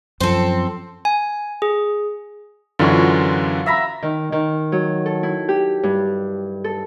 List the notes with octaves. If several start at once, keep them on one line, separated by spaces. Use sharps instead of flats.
F#2 F3 C4 A4
G#5
G#4
F#2 D3 E3 F4 F#4
E5 A#5 B5
D#3
D#3
F#3
A4
E4
G4
G2
A4